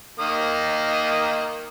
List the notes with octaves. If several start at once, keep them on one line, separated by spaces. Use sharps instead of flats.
D#3 A#3 D#6